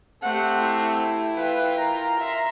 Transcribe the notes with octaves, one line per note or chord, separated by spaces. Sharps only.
A3 C4 G4 F#5
E4
E3 F4 B4 G5
A#4 A#5
E5 C6